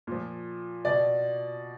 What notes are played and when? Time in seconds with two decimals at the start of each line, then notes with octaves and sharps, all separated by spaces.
0.07 A#2 F3
0.85 B2 D5